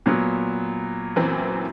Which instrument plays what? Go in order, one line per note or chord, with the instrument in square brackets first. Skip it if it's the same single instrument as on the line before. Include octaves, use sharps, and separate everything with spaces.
[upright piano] A#2 F#3 B3
[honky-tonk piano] F#2 E3 C4